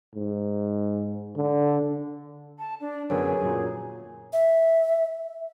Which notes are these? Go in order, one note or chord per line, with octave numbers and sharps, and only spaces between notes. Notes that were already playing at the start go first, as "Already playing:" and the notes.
G#2
D3
A5
D4
F#2 D3 B3 G#4 A#4 C#5
F#2 A#2
E5